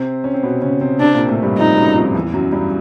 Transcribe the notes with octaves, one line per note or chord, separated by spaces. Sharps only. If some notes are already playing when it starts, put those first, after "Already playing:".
Already playing: C3 C4
C#4
C4
B2 B3
C#3 C#4
C3 C4
C3 C4 D4
A#2 A#3
A2 A3
G2 G3
F2 F3 D#4
F#2 F#3
F2 F3
E2 E3
F#2 F#3
G2 G3